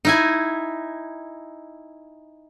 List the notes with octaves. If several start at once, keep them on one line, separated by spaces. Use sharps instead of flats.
D#4 E4 G#5